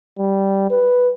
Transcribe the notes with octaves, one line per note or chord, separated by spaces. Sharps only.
G3
B4